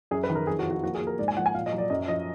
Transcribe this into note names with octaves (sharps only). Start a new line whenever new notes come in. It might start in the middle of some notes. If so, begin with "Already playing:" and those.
F#2 G#4
B4
D#3
A#4
F2 G#4
F#4
F3
F#4
A#3 F#4
G#4
A#3
A#4
G#2 D5
G#5
F3 F#5
G#5
A#2 F5
D#5
F#3
D5
F#2 D#5
F3 D#5